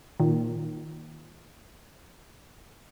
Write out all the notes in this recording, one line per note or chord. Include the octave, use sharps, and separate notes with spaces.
A#2 D#3